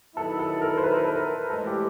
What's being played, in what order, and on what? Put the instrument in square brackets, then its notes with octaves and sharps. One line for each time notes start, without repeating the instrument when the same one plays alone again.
[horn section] D#3 F#3 B3 E4 [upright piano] A4
[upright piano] A4
A#4
C5
B4
A4
A#4
[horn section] A2 E3 G#3 [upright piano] A4
[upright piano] G4